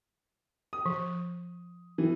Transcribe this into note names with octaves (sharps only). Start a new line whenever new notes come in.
D#6
F3
E3